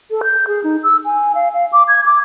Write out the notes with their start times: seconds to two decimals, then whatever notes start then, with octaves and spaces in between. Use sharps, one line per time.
0.11 A4
0.24 G6
0.47 G#4
0.64 D#4
0.83 E6
1.05 G#5
1.35 F5
1.54 F5
1.73 D6
1.88 G#6
2.05 D6